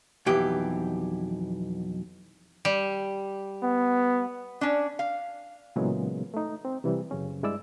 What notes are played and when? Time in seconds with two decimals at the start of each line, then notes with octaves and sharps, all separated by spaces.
0.26 B1 F2 E3 G4
2.65 G3
3.63 B3
4.61 C#4 D4
4.99 F5
5.76 A#2 C#3 E3 F#3 G#3 B3
6.34 A3 D#4
6.65 C4
6.84 C3 E3 G3
7.11 F#2 C#3 C#4
7.43 G2 G#3 E4 D5 E6